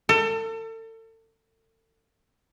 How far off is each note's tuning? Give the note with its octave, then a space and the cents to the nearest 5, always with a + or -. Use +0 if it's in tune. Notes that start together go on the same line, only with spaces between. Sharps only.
A4 +35